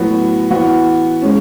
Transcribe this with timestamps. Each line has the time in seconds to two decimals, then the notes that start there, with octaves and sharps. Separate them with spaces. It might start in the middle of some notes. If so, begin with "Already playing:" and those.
Already playing: A2 F#3 B3 F#4
0.50 E3 B3 F#4
1.22 G#3 C#4